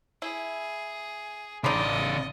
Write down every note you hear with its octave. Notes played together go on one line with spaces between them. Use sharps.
E4 G#4
A1 C#3 D4 D#4 D5 D#5 B5 C6